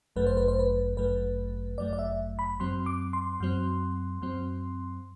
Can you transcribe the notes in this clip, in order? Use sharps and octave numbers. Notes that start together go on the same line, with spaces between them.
G1 F#2 F#3 A3 B4
C5
B4
C5
B4
G1 F#2 F#3 A3 B4
G1 F#2 F#3 A3 D5
D5
E5
B5
F#2 F#3 C4 C6
D6
C6
F#2 F#3 C4
F#2 F#3 C4